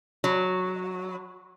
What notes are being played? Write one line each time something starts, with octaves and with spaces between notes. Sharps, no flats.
F#3